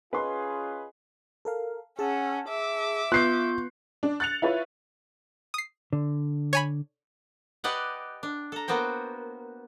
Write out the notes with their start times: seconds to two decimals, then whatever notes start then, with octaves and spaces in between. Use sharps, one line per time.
0.13 C#4 F4 G#4 B4 D#5 C6
1.45 A4 A#4 F5
1.99 C#4 G#4 F#5 A5 E6
2.48 E5 D6
3.12 B3 F4 C#6 F#6 G6 C7
4.03 D4
4.20 F#6 A6 C#7 F7
4.42 E4 F4 B4 C#5
5.54 D#6 C7
5.93 D3
6.53 C#5 G#5 B5
7.64 G4 B4 D5 D#5 F#5
8.23 D4
8.52 A4 A#5
8.68 A#3 B3 F#4 C5 G5